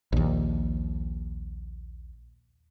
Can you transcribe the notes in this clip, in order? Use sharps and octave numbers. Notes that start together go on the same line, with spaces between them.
A#1 D#2